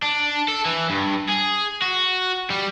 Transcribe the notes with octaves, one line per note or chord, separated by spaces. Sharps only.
D4
A4
E3
G2
G#4
F#4
G3